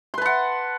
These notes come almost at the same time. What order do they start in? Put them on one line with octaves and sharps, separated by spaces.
C6 B4 A5 F#5